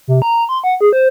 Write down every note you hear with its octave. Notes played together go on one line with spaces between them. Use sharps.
C3
A#5
C6
F#5
G#4
C5